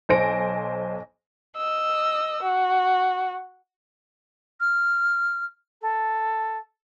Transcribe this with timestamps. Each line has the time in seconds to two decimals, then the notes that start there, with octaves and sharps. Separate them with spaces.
0.09 B1 C5 G#5 A#6 D7
1.57 D#5 E6
2.42 F#4
4.60 F6
5.82 A4